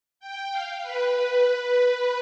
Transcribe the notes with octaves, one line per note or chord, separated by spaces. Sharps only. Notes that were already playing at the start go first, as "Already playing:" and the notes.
G5
F5
B4